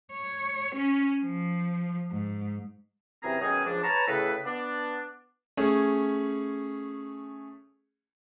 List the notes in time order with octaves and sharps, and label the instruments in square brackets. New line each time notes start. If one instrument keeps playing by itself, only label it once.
[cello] C#5
C#4
F3
G#2
[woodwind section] F#2 C3 E3 C4 G#4 A#5
B2 D#3 F#3 C#4 D#4 G#4
C#2 F3 D4
B4 C#5 A5 A#5
A2 C#3 A4 B4
B3 D4
[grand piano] A3 C#4 G#4